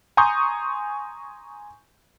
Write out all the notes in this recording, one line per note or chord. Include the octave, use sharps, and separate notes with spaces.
G#5 A#5 C6 C#6 D#6 G6